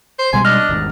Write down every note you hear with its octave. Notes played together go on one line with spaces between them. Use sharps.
C5
B2 G3 G#3 G#5 C6
D4 D#5 F6
G#1 E2 G2